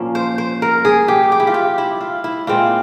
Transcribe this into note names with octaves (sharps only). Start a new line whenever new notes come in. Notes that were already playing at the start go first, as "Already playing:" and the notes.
Already playing: A#2 F3 A#3 C#4 F5
C5
C5
A#4
G#4
G4
G4
E4
F4
G4
E4
F4
E4
A#2 G#3 C4 F4